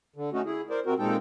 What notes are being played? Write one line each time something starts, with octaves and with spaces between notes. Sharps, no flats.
D3
A3 C#4 D#4 F#4
E4 G#4
A#4 C5 D5
C3 C4 F#4 A#4
A#2 G#3 C4 D#4 A4 G5